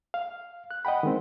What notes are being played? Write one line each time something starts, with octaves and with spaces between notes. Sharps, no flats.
F5
F#6
D#5 F#5 G5 B5
D#3 G#3 C4